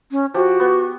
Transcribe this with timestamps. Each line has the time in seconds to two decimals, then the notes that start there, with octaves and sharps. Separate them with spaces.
0.11 C#4
0.34 F3 F#4 G4
0.60 B3